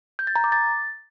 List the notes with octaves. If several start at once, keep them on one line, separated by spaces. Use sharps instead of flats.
G6
A6
A#5
D6
A6